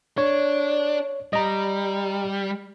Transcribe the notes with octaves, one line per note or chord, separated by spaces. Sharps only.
D4 C#5
G3 D#5 A#5